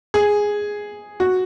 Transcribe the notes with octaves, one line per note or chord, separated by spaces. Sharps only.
G#4
F#4